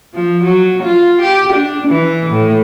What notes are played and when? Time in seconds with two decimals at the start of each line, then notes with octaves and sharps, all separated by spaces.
0.14 F3
0.44 F#3
0.83 F4
1.22 G4
1.53 D4
1.88 E3
2.30 A2